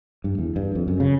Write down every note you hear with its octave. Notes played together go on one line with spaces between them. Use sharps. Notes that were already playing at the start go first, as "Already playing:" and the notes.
G2
E2
G2
F2
F#2
C#3